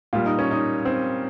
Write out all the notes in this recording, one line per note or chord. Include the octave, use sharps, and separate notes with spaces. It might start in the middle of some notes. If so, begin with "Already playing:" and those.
A#2 G3 F4
D#4
C#4
D#4
C4